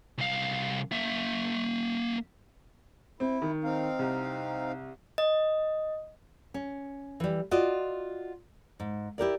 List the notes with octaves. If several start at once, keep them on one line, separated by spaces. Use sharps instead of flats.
C2 F5
A#3 E5
C4 E4
D#3
C4 D#4 F5
C2
D#5
C#4
E3 G3
F4 F#4 D5 D#5
G#2
E4 G4 A#4 D5